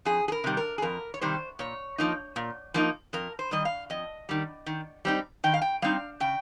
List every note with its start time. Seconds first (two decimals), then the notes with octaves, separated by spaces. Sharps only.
0.05 F2 G#4
0.28 G#4
0.32 A#4
0.44 C3 D#3 G3
0.57 A#4
0.78 G#4
0.82 F2 A#4
1.14 C#5
1.21 C3 D#3 G3 C5
1.59 A#2 C#5
1.98 F3 A#3 D#4
2.36 A#2
2.74 F3 A#3 D#4
3.13 F2 A#4
3.39 C5
3.51 D#3 G3 D#5
3.65 F5
3.90 F2 D#5
4.29 D#3 G3
4.66 D#3
5.05 G3 C4 D#4
5.44 D#3 G5
5.54 F5
5.62 G5
5.82 G3 C4 D#4 F5
6.20 C#3 G5